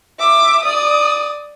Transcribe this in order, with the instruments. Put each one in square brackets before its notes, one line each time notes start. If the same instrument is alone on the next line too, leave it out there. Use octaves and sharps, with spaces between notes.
[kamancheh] E5 D6
D5 D#6